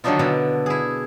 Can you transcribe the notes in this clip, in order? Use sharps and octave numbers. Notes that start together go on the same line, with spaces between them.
D3 D#3 F#3 D4 D#4 F4
B2 D3 E4
E4 G#4